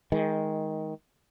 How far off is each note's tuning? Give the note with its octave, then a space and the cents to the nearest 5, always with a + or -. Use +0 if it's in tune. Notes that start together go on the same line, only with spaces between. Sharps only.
D#3 +15 G#3 +0